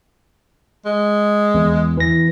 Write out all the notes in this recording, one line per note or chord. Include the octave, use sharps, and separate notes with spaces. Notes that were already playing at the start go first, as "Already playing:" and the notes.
G#3
E2
E3 A#6